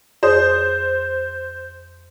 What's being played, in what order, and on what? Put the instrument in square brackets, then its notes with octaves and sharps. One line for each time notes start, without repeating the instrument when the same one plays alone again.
[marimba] F2 G#4 D#6 [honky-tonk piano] C5